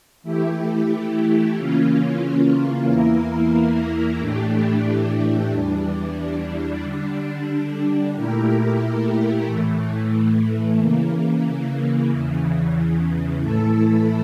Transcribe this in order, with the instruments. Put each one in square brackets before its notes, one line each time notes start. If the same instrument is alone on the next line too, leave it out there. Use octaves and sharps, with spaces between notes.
[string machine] E3 A3 E4 G4
C#3 E3 A#3 C#4 F4
E2 E3 A#3 E4 A#4
A2 E3 A3 D4 G4
E2 E3 G3 D4
D3 G3 D4
A#2 A3 E4 G4 A#4
A2 E3 A3
C#3 E3 A#3
E2 C#3 E3
A2 E3 A3 E4 A4